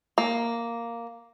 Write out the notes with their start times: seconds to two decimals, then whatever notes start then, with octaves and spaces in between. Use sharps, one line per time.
0.18 A#3